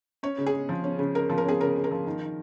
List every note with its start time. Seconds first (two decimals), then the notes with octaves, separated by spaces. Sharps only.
0.23 C#4 C#5
0.38 C#3
0.46 G#4
0.53 G#3
0.69 F3
0.84 C#4
0.99 C#3
1.15 G#3 A#4
1.30 F3
1.38 A#4
1.45 C#4 G#4
1.61 C#3 A#4
1.76 G#3
1.84 A#4
1.91 F3
2.07 D#3
2.21 D#3